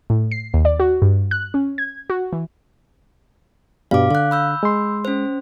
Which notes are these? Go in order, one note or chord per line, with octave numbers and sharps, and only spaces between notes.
A2
C7
D#2
D5
F#4
G2
F#6
C#4
G#6
F#4
E3
G2 B2 G3 F5 D6
D3 F5 F#6
B5 E6 G6
G#3 C6
C#4 C5